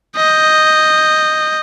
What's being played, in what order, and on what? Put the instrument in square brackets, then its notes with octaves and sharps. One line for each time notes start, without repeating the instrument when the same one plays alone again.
[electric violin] D#5 G6